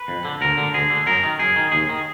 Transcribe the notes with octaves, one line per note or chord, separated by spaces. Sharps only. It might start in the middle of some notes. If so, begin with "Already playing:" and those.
Already playing: B4
F2
D3
D2 A#4
D3
D2 G#4
D3
F#2 A#4
D#3
F#2 G#4
D#3
D#2 G#4
D#3